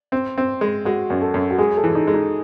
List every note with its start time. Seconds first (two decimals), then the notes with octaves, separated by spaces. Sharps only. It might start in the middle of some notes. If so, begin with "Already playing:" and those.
0.12 C4
0.38 C4
0.61 G#3
0.85 G#3 F#4
1.10 F#2
1.22 A4
1.34 F#2
1.51 F#4
1.58 G#3 G#4
1.77 A4
1.84 E3
1.95 D#4
2.07 G#3
2.14 D#4